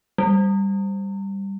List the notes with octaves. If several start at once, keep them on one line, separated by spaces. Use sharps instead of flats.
G3